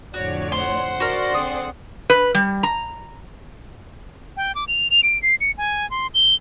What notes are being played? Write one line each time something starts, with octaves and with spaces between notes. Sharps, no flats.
F2 A2 D3 F#4 C#5 D5
C5 F#5 C6
F#4 A#4 D5 C6
D3 C4 G#4 D#6
B4
G3
A#5
G5
D6
F7
F7
D7
C7
C#7
G#5
C6
G7